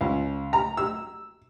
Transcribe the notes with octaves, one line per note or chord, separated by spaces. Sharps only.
C#2
A#5
E6